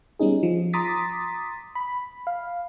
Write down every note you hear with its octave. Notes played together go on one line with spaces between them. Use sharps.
G3 B3 C#4 D#4 G#4
F3
A#5 C6 D6 D#6 A6 B6
B5
F5